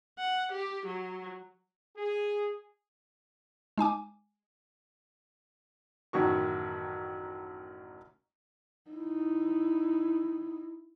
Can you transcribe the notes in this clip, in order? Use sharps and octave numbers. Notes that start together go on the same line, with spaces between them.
F#5
G4
F#3
G#4
G#3 D#4 G#5 D6
A1 F#2 D#3 F#4 C#6
D#4 E4